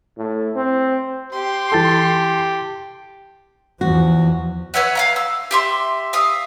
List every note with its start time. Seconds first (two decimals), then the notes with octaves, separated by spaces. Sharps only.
0.18 A2
0.55 C4
1.32 G4 C6
1.72 E3 A4 G5 A5 A6
3.81 E2 F3 F#4
4.74 B4 C#5 E5 F#5
4.95 F5 F#5 A#5
5.16 E6
5.51 G4 E5 C6
6.13 E5 F5 D#6